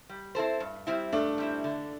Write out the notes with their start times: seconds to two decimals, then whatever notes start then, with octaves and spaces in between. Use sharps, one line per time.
0.09 G3
0.35 C4 E4 A4 C5
0.60 G2
0.87 G3 C4 E4
1.13 G2 A3 D4
1.38 G3 C4 E4
1.64 D3